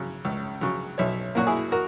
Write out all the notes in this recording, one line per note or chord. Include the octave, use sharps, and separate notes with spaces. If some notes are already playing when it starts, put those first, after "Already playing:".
Already playing: C#3 F#3
C#2
C#3 F#3
B1 C#5 E5
A#2 F#3 A#3 F#4
E4 G#4
F#4 A#4